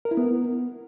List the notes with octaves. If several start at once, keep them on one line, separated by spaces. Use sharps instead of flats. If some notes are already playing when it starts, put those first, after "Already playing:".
A#4
E4
B3